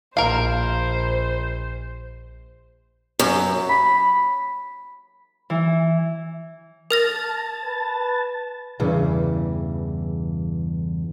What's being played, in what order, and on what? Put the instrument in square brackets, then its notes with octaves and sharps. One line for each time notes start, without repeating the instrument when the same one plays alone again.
[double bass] A#1 [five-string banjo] A#4 F5 [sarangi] C5
[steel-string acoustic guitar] F#2
[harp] B5
E3
[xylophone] A#4 F6 A#6 [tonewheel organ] A5
[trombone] B4
[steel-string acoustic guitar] E2 G2 C#3 E3